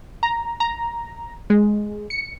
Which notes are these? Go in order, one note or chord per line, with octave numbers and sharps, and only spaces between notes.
A#5
A#5
G#3
C#7